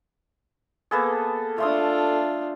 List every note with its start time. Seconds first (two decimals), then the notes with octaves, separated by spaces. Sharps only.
0.91 A#3 B3 G#4 A4
1.58 A3 D4 F4 C6 D#6